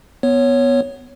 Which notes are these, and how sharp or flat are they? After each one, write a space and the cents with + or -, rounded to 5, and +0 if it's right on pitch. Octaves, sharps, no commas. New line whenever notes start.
B3 +0 C#5 +0